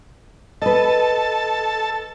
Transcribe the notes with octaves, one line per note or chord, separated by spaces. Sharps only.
A4 B4 D#5 A5